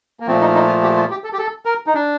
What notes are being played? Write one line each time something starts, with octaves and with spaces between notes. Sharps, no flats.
A#3
A#2 F3 A3 C4
D#4
D#4
F4
G4
F4
G4
A4
G4
A4
A#4
D#4
D4